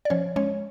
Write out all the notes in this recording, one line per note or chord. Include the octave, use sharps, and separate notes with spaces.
D5
F3 C#4 C#5
G#3 C#4 C#5